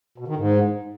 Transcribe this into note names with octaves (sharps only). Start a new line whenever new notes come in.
B2
D#3
G#2